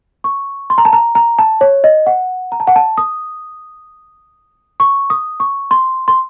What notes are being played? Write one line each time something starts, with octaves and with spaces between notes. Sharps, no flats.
C#6
C6
A#5
A5
A#5
A#5
A5
C#5
D#5
F#5
A#5
A5
F#5
A5
D#6
C#6
D#6
C#6
C6
C6